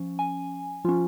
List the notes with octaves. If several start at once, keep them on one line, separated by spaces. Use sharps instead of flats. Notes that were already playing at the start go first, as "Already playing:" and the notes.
Already playing: F3 C#4
G#5
F3 C#4 F4